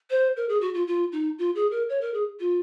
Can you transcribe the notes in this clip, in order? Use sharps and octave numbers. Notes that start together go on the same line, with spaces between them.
C5
A#4
G#4
F#4
F4
F4
D#4
F4
G#4
A#4
C#5
A#4
G#4
F4